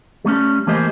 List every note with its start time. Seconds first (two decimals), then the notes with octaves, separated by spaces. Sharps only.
0.25 G3 A3 A#3 C#4
0.67 E3 A3 A#3 G4 C5 D#5